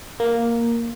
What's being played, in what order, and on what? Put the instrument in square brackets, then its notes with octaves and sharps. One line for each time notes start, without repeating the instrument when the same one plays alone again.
[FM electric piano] A#3